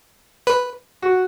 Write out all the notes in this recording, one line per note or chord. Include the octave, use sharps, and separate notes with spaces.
B4
F#4